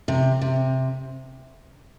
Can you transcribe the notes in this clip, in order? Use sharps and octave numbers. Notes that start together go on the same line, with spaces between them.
C3
C3